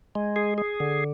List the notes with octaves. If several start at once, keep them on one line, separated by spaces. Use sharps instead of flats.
G#3
G#4
G#4
D3